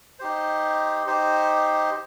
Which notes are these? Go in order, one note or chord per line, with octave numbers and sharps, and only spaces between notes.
D#4 G4 C5
D#4 G4 C5